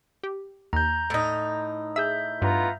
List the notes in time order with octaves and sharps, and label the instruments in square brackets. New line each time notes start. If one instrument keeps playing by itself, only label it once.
[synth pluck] G4
[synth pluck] D#2 [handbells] A#5 G6
[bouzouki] A2 D#4
[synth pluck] G#4 E6 [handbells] E5 G6
[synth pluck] G2 [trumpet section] B3 F4 A#5